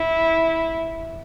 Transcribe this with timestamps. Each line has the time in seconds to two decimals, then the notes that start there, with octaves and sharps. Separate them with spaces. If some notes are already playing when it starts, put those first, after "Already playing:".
Already playing: E4